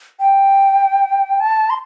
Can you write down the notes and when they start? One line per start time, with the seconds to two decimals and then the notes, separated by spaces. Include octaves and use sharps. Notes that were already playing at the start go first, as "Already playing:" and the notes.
0.19 G5
1.40 A5
1.70 C6